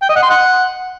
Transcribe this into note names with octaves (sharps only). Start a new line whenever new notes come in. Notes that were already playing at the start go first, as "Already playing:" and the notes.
G5
D#5
F#5
C6
F#5